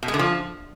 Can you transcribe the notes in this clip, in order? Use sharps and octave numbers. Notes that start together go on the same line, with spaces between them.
B2
G#3
D3
F3